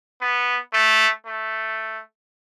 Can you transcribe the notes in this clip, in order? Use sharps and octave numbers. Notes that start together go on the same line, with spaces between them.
B3
A3
A3